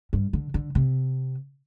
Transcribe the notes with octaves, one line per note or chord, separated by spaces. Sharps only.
G2
D3
D3
C3